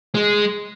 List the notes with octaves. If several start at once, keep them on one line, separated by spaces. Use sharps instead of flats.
G#3